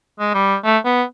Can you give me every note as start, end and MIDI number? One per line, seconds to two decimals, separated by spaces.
0.19 0.31 56
0.34 0.56 55
0.64 0.78 57
0.85 1.03 59